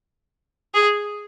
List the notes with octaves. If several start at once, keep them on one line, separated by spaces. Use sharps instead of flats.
G#4